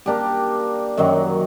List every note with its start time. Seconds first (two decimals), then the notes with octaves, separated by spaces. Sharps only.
0.06 A#3 D4 G4
0.97 F#2 D#3 F#3